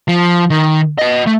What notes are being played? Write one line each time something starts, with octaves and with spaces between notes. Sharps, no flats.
F3
D#3
B4 D#5
A3